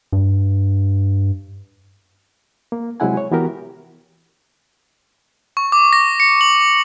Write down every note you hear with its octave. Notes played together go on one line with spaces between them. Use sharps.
G2
A#3
C3 F#3 G#3 E4 F#5 G#5
C#5
E3 B3 F#4 G4 A#4
C#6
D6
A#6
C#7
F#7